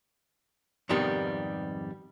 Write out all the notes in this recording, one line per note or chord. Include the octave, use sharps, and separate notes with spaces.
F2 G#2 C3 D#3 G3 B3